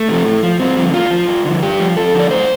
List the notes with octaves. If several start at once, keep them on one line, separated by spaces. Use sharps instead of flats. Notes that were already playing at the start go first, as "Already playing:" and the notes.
Already playing: A3
C3 F3
A2
F3
G2 C4
D3 F3
A2 F4
F3
G2
D3 F3
G2 G4
F3
F2 A4
D3 F3 D5
A2 C5